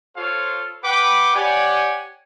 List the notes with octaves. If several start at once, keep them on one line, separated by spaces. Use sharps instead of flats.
F4 A4 C5 C#5 F5
B4 F#5 G5 B5 D6
G4 C#5 D5 F#5 G#5